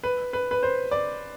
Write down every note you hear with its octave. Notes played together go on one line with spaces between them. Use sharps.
B4
B4
B4
C5
D5